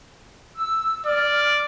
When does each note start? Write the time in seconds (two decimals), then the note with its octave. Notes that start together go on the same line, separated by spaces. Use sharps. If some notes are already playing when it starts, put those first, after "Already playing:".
0.56 E6
1.06 D5 F6